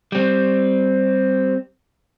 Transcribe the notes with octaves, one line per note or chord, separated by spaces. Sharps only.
G3 C4